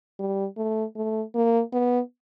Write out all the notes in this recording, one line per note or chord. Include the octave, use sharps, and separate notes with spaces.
G3
A3
A3
A#3
B3